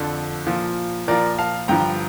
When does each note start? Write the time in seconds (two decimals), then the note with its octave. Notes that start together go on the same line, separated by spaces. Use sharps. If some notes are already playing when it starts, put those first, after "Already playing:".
Already playing: F2 D3 F3 A4
0.47 A#2 F3
1.08 A#2 F3 A#4 D5
1.38 F5 A5
1.68 G2 D3 F3 G5 A#5